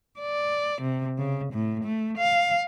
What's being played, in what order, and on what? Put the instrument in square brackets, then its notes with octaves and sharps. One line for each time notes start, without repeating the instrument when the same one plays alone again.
[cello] D5
C3
C#3
A2
A3
F5